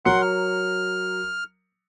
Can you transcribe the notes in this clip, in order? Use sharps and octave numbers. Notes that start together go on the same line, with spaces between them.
F#3 A#4 F#5 C6 C#7
F6